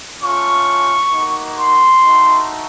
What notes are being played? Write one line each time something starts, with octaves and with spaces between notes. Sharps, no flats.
A3 C#4 F4 C#6
A#3 D#4 F#4
C6
A3 D#4 F#4